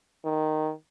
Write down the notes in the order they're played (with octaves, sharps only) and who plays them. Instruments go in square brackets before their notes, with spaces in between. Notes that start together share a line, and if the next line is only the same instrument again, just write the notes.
[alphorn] D#3